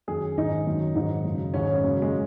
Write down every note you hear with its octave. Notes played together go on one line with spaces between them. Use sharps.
F#2 D#3 G#4
G#2 D#3 D#4
F#2 D#3
G#2 D#3 D#4
F#2 C#3
G#2 D#3 C#4
F#2 C#3
G#3